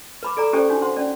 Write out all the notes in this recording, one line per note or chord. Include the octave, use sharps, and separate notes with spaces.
B4 B5 D6
A4 D5 A#5
C#4 G4 A4 C5 D5 G5
D4 D#4 F#4
C5 F#5 C6
C#4 D5